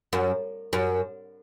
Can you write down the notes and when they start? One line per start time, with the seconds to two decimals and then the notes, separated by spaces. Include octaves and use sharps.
0.13 F#2
0.73 F#2